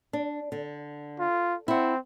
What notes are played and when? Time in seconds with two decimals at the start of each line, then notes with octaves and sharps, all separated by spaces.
0.13 D4
0.52 D3
1.19 F4
1.68 C4 E4 F#5